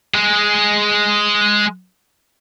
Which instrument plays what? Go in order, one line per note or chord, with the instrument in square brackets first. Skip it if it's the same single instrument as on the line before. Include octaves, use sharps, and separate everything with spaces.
[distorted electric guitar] G#3 G#4